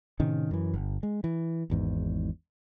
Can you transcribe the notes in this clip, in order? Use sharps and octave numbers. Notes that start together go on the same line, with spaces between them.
A2 C3 D#3 C#4
F#2 E3
G1
G#3
E3
G#1 E2 G#2